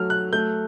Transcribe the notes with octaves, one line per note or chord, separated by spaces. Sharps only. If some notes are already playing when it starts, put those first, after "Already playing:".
Already playing: F#3 A3 F6
F#6
A3 G6